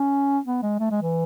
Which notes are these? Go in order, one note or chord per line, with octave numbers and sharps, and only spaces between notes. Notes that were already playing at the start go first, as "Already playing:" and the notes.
Already playing: C#4
B3
G#3
A3
G#3
E3